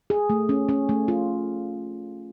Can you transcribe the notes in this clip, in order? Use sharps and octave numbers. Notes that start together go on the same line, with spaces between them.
G#4
A3
C#4
C#4
A3
F4